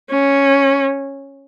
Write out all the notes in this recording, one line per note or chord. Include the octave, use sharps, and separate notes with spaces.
C#4